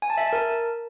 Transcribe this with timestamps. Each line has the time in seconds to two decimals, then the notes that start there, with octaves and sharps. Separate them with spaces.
0.02 G#5
0.10 A5
0.17 E5
0.25 A5
0.33 A#4